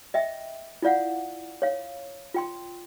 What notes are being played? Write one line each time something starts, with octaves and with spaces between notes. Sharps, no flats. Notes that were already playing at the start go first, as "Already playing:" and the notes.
D#5 E5 G5
E4 F4 D5 F5 F#5
C#5 F5
F4 G5 C6